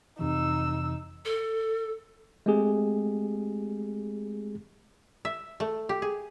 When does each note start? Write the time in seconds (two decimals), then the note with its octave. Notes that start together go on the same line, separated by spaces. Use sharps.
0.19 F2 C3 E3 D#4 E6
1.25 A4
2.46 G#3 A3 C4 G4 G#4
5.25 E5
5.60 A3
5.89 G4
6.02 G#4